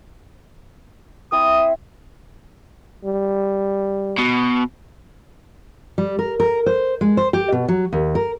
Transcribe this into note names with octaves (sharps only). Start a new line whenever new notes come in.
C4 E4 D#6
G3
B2
G3
A#4
A#4
C5
G#3
C5
G4
B2
F#3
D#2
A#4